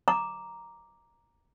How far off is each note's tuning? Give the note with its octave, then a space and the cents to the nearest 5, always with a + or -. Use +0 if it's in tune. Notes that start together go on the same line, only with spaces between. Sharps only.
A#5 +0 D6 +0